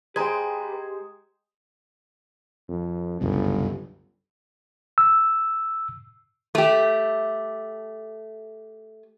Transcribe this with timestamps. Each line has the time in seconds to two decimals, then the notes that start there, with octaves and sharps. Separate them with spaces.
0.16 G#3 G4 B4 C5 G5 A#5 G#6
2.69 F2
3.21 G1 C2 F#2 C#3
4.98 E6
6.55 A3 G4